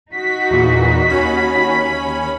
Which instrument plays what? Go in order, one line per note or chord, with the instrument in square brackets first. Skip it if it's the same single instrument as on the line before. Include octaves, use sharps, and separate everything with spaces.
[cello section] D#4 F#4 [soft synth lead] B6
[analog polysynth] E2 A#2
D#2 C#4 B5